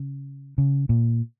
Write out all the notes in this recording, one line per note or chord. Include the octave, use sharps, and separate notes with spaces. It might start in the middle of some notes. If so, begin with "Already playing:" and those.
Already playing: C#3
C#3
A#2